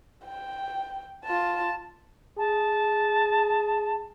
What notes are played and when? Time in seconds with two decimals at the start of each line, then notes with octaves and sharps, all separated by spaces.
0.25 G5
1.25 F4 A5
2.38 G#4 A5